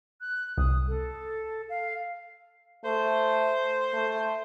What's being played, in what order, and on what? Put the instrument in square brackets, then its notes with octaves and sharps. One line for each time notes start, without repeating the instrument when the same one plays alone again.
[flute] F#6
[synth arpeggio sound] C2 [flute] D#6
[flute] A4
F5
[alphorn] A3 [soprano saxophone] C5
[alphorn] A3